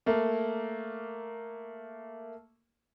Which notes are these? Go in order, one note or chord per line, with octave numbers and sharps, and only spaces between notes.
A3 A#3